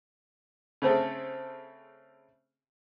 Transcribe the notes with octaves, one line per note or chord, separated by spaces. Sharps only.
C#3 A3 C4 G#4 A4